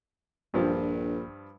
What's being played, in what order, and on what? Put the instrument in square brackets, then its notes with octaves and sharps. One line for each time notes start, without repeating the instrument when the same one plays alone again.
[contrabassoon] A#1 [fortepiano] G2 F3 G3